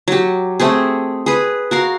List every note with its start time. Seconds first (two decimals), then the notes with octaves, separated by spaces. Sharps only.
0.08 F#3 G4
0.60 A3 C4 G4 G#4
1.26 G#4 B4
1.71 F#4 A#4 F5